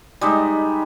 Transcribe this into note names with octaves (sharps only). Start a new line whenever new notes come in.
G3 G#3 D#4